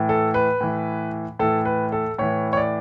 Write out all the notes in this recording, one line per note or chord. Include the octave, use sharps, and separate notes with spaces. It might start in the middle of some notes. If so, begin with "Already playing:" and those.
Already playing: A2 E3
A4
B4
A2 E3
A2 E3 A4
B4
A4
A2 E3 C#5
C#5
D5